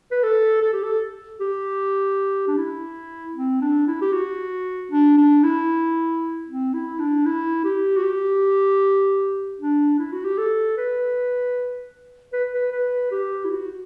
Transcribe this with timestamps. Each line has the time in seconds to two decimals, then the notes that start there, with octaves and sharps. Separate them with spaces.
0.11 B4
0.23 A4
0.62 A4
0.73 G4
0.84 A4
1.40 G4
2.48 D4
2.57 E4
3.36 C4
3.62 D4
3.88 E4
4.02 G4
4.13 F#4
4.91 D4
5.18 D4
5.44 E4
6.48 C4
6.74 E4
7.00 D4
7.26 E4
7.65 G4
7.97 F#4
8.04 G4
9.60 D4
9.99 E4
10.12 F#4
10.25 G4
10.38 A4
10.77 B4
12.33 B4
12.54 B4
12.72 B4
13.12 G4
13.45 E4
13.51 F#4